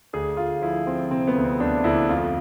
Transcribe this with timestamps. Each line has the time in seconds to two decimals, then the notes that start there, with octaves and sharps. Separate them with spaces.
0.13 D2 G#4
0.37 D2 F4
0.62 F3 E4
0.87 F3 C4
1.11 C3 C4
1.27 B3
1.35 D2
1.44 C4
1.60 D2 D4
1.84 D2 E4
2.09 F2 F4